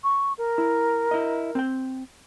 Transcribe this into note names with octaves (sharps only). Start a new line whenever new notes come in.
C#6
A#4
E4
E4 D#5
C4 G5